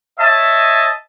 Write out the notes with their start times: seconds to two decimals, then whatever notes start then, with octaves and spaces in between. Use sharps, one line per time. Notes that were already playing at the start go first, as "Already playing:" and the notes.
0.19 C#5 D#5 E5 A5